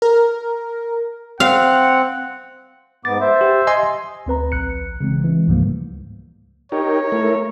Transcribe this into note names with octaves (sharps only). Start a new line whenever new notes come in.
A#4
C4 F5 F#5
G#2 B3 D6 A6
C5 E5
G4
D#5 G#5 C6
D2 C4 B4 A#5
A#1 F#6 C#7
C#3 E3 G#3 C4
E3 G#3
C#2 G#2 C#3 F3 G3 A#3
D#4 G4 A#4 C#5
A3 E4 A#4